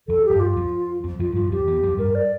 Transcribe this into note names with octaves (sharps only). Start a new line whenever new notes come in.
F2 F3 A4
G4
G2 G3
F4
F2 F3
F2 F3
F2 F3 F4
G2 G3 F4
F2 F3 G4
E2 E3
F2 F3
G2 G3 A#4
D5